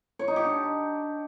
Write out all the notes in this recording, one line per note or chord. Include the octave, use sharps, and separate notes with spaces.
C#5
D#4
G4
D4